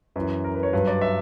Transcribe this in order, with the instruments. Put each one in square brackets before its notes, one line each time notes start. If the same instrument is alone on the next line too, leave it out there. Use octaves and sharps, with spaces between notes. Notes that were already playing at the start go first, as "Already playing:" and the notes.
[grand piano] F#2 E3 B4
A#4
B4
C#5
G2 F#3 B4
D5
E5